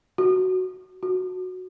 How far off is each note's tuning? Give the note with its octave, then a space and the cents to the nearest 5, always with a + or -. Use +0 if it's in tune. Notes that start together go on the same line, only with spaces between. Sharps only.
F#4 +5
F#4 -5